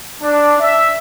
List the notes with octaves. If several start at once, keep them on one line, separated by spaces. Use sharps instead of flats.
D4
E5